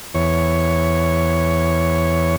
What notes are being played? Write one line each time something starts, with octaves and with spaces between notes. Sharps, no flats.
E2 C#5